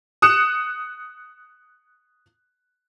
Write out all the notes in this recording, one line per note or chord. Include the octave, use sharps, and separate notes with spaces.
D#6 F#6 C#7 E7